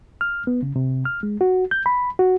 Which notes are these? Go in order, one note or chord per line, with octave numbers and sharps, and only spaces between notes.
F6
B3
C#3
C3
F6
G#3
F#4
G6
B5
F#4